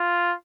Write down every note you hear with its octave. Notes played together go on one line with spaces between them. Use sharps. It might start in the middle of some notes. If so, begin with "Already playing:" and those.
Already playing: F4